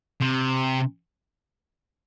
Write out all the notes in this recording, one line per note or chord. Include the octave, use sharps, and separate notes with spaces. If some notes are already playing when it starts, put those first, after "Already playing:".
C3